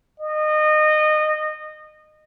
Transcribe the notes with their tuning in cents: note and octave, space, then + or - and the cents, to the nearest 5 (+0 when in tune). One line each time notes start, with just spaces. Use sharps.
D#5 -25